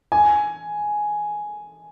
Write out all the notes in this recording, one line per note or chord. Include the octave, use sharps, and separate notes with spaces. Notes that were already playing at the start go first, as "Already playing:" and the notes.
G#5